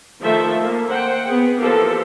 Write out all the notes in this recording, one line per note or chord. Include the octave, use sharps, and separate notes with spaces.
D#3 F3 A3 A4 C5 E5
A#3
C5 F#5 G5
B3 G#4
E3 F3 A#3 G4 A4